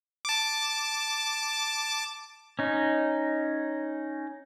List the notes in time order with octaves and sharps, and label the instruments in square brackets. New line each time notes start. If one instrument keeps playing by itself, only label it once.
[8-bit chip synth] A5 D6
[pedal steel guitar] C#4 D#4